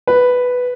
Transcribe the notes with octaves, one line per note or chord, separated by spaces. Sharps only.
B4